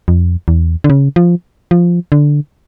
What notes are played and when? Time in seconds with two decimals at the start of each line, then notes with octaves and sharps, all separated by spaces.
0.08 F2
0.48 E2
0.84 D3
0.90 C#3
1.16 F3
1.71 F3
2.12 D3